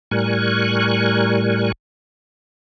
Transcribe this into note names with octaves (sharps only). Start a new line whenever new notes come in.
A2 G3 A#4 G#5 C#6 F#6